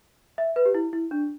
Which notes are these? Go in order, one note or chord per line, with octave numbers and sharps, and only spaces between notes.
E5
B4
G4
E4
E4
D4